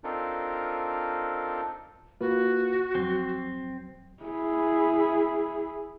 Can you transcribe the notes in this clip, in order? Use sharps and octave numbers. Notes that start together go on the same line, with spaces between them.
C4 D4 D#4 F4 A4 A#4
A#3 F4 F#4 B4
F2 F#3 C4
E4 G#4